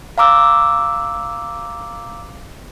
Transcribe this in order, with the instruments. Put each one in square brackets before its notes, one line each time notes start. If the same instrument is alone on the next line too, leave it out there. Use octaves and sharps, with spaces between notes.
[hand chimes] F5 A#5 D6 E6